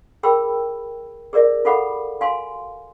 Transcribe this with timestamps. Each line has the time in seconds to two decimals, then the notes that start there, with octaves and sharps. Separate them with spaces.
0.23 G#4 A#4 G5 B5 E6
1.33 G#4 A#4 D5 E5
1.65 F4 A4 F5 F#5 B5 D6
2.21 F#4 F5 G#5 C6